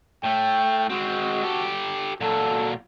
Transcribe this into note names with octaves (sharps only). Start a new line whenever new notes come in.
A2 A3 G5
G#3 C4 F#4
G4 A4
A#2 F#3 A4